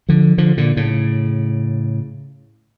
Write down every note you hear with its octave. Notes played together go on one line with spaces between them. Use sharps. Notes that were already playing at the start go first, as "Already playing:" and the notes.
D3 F3
D3 F3
A#2 D3
A2 C#3